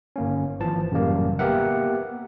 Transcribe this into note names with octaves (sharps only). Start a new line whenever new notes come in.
G1 A#3 C#4
G#1 E3 F3 A5
A1 F#2 C#3 G3 A#3
A#3 B3 G4 A#4 E5 F#5